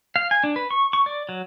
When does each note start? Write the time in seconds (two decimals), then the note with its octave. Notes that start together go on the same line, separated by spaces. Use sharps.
0.16 F5
0.31 G#5
0.44 D4
0.56 B4
0.71 C#6
0.93 C#6
1.06 D5
1.29 F#3